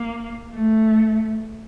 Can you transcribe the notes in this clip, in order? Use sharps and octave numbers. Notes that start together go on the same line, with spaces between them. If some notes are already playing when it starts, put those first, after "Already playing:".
Already playing: A#3
A3